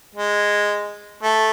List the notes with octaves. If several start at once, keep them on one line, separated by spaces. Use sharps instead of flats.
G#3
A3